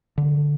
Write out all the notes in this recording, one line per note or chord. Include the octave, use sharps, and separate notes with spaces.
D3